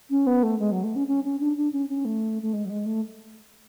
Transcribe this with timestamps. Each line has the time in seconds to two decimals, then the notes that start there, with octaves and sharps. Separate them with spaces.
0.10 C#4
0.27 B3
0.43 A3
0.59 G#3
0.72 F#3
0.84 A3
0.96 C#4
1.08 C#4
1.24 C#4
1.40 D4
1.56 D4
1.73 C#4
1.89 C#4
2.05 A3
2.42 A3
2.53 G#3
2.65 F#3
2.70 G#3
2.86 A3